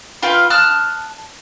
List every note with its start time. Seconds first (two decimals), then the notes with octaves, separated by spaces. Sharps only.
0.23 F4 B4 F5 G5
0.50 A5 D#6 F6 F#6